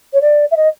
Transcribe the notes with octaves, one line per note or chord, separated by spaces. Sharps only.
C#5
D5
E5
D#5